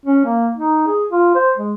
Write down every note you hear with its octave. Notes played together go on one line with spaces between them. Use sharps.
C#4
A#3
D#4
G#4
F4
C5
G#3